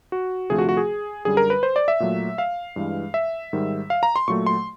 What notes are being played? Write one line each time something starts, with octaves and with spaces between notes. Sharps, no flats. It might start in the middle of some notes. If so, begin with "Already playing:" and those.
F#4
D2 C3 F3 A3 G#4
F#4
F#4
G#4
F#2 D3 G3 G#4
A#4
B4
C5
D5
E5
A#2 F#3 A3
F5
G2 E3 G#3
E5
G#2 D#3 G3
F5
A#5
C6
A#2 F#3 A3 C#6
C6